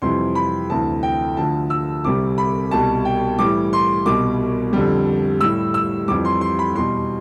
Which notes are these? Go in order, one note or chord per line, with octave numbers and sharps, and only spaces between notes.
F2 C3 E3 G3 C6
B5
D2 C3 E3 A5
G5
D2 D3 F3 A5
E6
C2 C3 G3 D6
B5
C2 B2 G3 A5
G5
A2 E3 G3 D6
C6
C2 B2 G3 D6
F2 D3 G3
A2 G3 E6
E6
F2 E3 G3 D6
C6
C6
B5
E2 B2 G3 C6